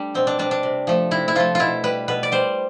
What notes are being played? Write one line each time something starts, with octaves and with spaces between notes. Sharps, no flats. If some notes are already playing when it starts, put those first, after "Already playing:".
Already playing: G3 A3 D4
B2 C4
D4
G3 D4
D4
C3
F3 A3
C3 E4
E4
F3 A3 F4
B2 E4 F4
G3 B4
B2 B4
D5
G3 C5